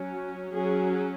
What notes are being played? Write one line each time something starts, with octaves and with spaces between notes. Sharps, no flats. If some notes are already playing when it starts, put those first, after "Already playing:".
Already playing: F#3 C#4
F#3 C#4 G#4